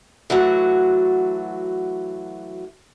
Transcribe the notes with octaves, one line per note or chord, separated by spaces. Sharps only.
E3 F#3 A3 F#4